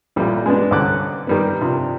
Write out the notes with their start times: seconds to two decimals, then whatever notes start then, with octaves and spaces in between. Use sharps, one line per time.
0.16 A1 A#2 F3 G3 A#3
0.46 G#3 B3 D4
0.71 C2 D3 C#4 D6 F#6
1.27 D#3 G3 B3
1.61 C3 F3 D4